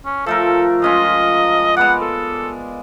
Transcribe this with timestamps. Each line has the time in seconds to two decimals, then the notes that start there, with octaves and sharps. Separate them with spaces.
0.05 C#4
0.26 F3 A3 A4 A#4
0.82 G#3 C#4 F4 D#5
1.77 G#3 B3 D5 F#5
2.01 A4